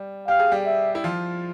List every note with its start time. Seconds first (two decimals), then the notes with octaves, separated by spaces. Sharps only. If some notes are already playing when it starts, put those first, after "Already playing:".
Already playing: G3
0.27 G4 F5
0.39 G#4
0.52 G3 G4
0.66 E5
0.95 E4
1.04 F3 F4